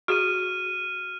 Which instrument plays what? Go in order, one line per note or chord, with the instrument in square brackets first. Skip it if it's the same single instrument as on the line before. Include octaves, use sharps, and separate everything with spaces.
[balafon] F#4 G#4 [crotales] F6 D#7